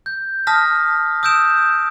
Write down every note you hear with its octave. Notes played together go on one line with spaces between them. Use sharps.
G6
A5 D#6 F6 A#6 B6
D#6 E6 G6 D7 E7